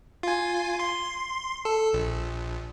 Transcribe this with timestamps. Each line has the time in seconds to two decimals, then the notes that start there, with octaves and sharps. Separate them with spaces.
0.23 F4 G#5
0.79 C6
1.65 A4
1.93 A#1